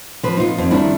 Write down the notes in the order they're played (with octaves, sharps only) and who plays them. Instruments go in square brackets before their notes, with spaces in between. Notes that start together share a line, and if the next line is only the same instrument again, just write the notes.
[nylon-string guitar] F3 B4
D#4 F4
F2
D#3 G3 D4 E4